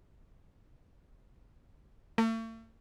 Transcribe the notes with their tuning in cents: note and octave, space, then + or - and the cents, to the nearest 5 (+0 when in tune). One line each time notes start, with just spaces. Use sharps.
A3 +40